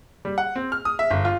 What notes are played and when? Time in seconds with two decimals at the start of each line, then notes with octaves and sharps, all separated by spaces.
0.25 G3
0.38 F#5
0.56 C4
0.72 F6
0.85 D#6
0.99 E5
1.11 G1
1.25 F4